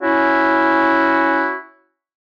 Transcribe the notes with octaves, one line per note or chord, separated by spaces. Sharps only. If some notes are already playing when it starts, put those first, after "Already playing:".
C#4 E4 F#4